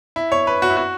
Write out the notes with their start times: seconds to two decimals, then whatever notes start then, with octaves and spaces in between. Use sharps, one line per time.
0.16 E4
0.32 C#5
0.47 B4
0.62 F#4
0.70 E4
0.77 F#4